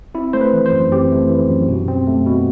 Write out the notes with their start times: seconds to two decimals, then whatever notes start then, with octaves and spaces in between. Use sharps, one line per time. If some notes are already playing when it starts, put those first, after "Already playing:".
0.14 C4 E4
0.33 A3 C5
0.41 B4
0.53 E3
0.66 C5
0.72 F#2
0.92 C4 G4
1.12 A3
1.30 E3
1.49 F#2
1.68 B2
1.88 C4
2.08 A3
2.26 B2